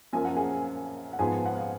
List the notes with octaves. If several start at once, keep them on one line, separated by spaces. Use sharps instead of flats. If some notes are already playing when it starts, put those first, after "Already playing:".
F#2 F3 A#3 G#5
F#5
G#4 G#5
F#5
G#2 F3 B3 G#4 G#5
F#5
F5